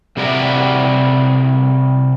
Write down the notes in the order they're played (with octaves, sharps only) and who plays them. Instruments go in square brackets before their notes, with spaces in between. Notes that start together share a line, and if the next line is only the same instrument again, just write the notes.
[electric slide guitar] C3 G3 F#4 A#4 D5 E5